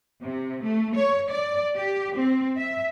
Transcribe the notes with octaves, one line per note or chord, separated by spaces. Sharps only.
C3
A3
C#5
D5
G4
C4
E5